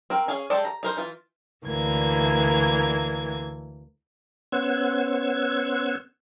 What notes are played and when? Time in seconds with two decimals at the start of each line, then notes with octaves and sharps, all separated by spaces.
0.10 C4 A#4
0.28 C#4 G#4 F5 G#5
0.50 G#3 G4 A4 C5 D5
0.65 A#5
0.83 D#4 A#4 C5
0.97 E3 F4
1.66 D2 E3 A#3 G#6
4.52 B3 C#4 C5 F#5 E6 G#6